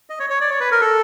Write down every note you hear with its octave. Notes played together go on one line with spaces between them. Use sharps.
D#5
C#5
C#5
D5
C#5
B4
A#4
A4